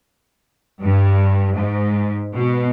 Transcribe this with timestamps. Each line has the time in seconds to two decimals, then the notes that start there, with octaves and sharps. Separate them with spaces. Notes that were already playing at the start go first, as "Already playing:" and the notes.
0.83 G2
1.57 G#2
2.35 B2